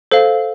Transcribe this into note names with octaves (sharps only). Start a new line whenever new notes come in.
A4 C5 F5